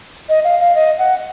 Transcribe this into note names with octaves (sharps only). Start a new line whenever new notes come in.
D#5
F5
F5
D#5
F#5